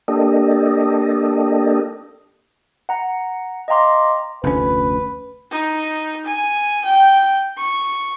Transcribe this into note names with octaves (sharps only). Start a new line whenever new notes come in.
A#3 D4 G4 A4 D#5
F#5 A#5
D#5 F5 G5 A#5 C6 D6
F1 D2 C#4 B4
D#4
G#5
G5
C#6